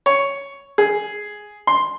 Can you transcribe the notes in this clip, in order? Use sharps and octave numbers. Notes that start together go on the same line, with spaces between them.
C#5
G#4
C6